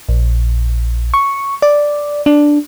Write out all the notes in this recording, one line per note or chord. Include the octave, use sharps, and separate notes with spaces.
A#1
C#6
D5
D4